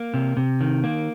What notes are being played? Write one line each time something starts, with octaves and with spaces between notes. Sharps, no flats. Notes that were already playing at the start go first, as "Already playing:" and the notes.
Already playing: A#3
C3
C3
D#3
A#3